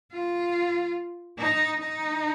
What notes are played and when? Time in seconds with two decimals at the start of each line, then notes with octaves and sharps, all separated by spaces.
0.13 F4
1.38 D#4
1.80 D#4